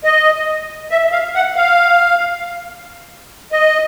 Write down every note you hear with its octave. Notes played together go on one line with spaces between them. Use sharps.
D#5
E5
F5
F#5
F5
D#5